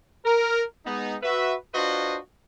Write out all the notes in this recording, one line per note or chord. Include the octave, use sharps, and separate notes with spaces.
A#4
G#3 B3 D#4
F#4 B4 E5
D4 F4 F#4 B4 C5 D#5